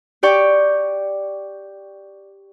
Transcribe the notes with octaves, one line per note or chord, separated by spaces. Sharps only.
G4 D5 G5 C#6